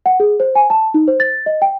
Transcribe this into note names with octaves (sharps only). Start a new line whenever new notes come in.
F#5
G#4
C5
G#5
A5
D#4
C5
A6
D#5
G5